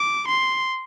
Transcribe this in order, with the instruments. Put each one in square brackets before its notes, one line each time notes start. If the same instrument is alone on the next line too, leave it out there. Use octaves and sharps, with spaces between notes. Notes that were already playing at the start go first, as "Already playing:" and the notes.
Already playing: [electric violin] D6
C6